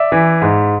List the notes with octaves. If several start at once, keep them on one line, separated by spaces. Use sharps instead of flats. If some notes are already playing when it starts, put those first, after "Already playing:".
Already playing: D5 E5
E3
G#2